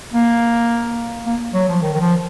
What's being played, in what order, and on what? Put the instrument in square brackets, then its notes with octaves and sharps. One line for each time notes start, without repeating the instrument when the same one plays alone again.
[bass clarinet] A#3
A#3
F#3
F3
D#3
D#3
F3